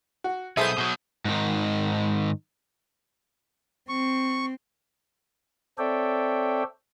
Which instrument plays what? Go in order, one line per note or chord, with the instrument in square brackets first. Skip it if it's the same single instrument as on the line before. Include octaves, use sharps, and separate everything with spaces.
[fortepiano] F#4
[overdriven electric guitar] B1 B3 [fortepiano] G#4 A4 C5 [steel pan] E5 [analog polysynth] D#6 G6
[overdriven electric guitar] B2 F#3
G#2 D#3
[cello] C4 [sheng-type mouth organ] C#6
[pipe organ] C4 A4 C#5 D5 E5 G5